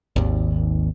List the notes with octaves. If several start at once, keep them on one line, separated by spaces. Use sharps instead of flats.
G#1 D#2